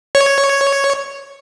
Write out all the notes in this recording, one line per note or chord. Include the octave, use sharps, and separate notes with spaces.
C#5